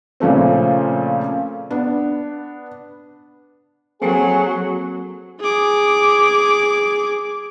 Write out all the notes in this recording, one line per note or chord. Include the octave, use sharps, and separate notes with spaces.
A#2 C#3 F3 A3 C4
B3 D4
F#3 A#3 C4 G#4 A4
G#4 D6